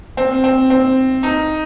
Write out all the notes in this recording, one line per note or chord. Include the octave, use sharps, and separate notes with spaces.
C4
C4
C4
D#4